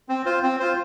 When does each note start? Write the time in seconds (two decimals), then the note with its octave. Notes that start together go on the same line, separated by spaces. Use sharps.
0.09 C4
0.26 F4 C5
0.43 C4
0.60 F4 C5